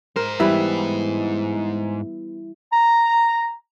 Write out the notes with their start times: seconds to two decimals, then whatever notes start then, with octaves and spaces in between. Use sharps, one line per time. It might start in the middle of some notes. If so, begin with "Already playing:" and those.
0.16 G#2 A#4 C5
0.40 E3 G3 B3 E4
2.71 A#5